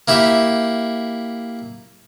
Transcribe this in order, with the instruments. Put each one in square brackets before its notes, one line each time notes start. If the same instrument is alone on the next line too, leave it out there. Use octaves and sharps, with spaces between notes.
[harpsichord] A#3 E4 G4 E5